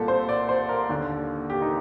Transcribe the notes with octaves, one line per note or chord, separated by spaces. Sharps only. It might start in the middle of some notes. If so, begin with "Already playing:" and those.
Already playing: C2 A#2 A4
C5
D5
C5
A#4
D#2 D3
G4
D#4